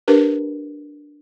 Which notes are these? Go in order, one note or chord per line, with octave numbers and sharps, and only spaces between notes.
D4 G4 A#4 B4